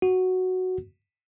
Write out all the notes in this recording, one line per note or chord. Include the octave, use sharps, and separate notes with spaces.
F#4